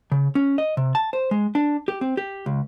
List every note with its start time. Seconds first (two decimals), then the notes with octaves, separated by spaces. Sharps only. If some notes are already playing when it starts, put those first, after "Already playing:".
0.12 C#3
0.35 C#4
0.58 D#5
0.77 C3
0.95 A5
1.13 C5
1.31 G#3
1.55 D4
1.88 G4
2.01 C4
2.17 G4
2.46 C#2